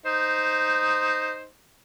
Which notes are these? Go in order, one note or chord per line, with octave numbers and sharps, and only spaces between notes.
D#4 C5